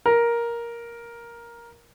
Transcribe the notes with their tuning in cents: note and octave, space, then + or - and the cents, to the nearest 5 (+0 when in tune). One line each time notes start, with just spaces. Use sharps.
A#4 +10